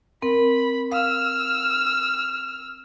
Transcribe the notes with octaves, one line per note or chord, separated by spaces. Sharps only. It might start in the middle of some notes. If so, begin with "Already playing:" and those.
C4 A#4 B5
F5 E6 F6